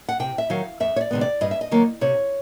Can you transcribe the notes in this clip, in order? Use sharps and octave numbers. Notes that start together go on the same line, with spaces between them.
F#5
C3 G5
E5
D#3 F#3 F5
F2 E5
C#5
D5
C3 D#3 G#3 B3
D5
G2 D#5
E5
D#5
D#3 F#3 A#3
C3 C#5